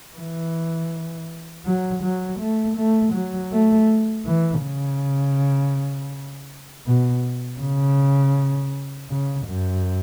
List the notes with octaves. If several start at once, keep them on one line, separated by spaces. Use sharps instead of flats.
E3
F#3
F#3
A3
A3
F#3
A3
E3
C#3
B2
C#3
C#3
F#2